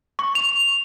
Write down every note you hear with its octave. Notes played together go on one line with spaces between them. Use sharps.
C#6
F7